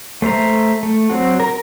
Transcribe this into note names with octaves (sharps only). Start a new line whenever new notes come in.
A3 C5 E5 A#5
A3
F#3 C4 F#4
A#4 A#5